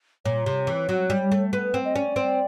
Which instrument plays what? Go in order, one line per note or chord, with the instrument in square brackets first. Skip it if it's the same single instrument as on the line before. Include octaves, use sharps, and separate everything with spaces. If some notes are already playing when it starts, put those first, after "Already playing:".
[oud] A#2 [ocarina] C#5
[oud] C3
E3
F#3
G3
A3
B3
C4
[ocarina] D#5
[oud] C#4 [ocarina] D5
[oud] C4